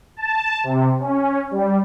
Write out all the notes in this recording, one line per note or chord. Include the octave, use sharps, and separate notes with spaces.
A5
C3
C#4
G3